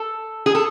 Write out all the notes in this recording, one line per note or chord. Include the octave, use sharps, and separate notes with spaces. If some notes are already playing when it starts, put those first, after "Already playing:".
Already playing: A4
G#4
A4